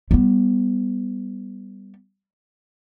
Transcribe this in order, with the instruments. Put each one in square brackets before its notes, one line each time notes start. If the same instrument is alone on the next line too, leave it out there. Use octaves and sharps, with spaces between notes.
[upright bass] G3 B3